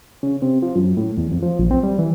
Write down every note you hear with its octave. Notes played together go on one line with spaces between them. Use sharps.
C#3
C3
F3
F#2
A2
E2
F2
F3
A#1
C4
G3
E3